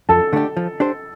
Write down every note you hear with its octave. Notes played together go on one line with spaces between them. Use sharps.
F2 A4 A5
D3 A3 D4 G4
F3
D4 G4 C5